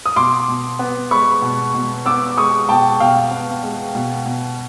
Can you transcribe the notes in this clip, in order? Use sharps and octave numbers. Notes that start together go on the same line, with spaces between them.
D#6
B2 C6 D6
B2
B3
G#3 B5 C#6
B2
B2
B3 D6 E6
G#3 C#6 D#6
B2 G5 A5
B2 F5 G5
B3
G#3
B2
B2